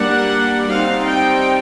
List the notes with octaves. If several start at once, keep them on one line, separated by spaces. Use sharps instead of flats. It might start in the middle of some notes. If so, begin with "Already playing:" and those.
Already playing: G3 A#3 D4 F#5
G3 C4 D#4 F5
G5